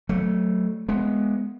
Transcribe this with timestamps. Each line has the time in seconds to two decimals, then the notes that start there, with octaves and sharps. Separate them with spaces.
0.09 F#3 A3
0.89 G#3 B3